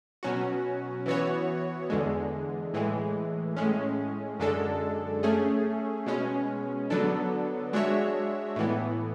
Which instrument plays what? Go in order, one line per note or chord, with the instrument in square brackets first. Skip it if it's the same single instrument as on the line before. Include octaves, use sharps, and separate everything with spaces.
[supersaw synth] B2 F#3 C#4 F#4
E3 B3 F#4 C#5
E2 D3 G#3
A2 E3 G#3
A2 G#3 C#4
F#2 D3 G#3 D4 A4
A3 C#4 G#4
B2 G#3 C#4
D3 F#3 B3 D4 A4
G#3 D4 F#4 C#5 E5
A2 E3 B3